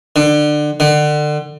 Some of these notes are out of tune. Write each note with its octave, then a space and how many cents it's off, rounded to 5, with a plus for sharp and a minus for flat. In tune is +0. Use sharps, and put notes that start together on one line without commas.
D3 +25
D3 +30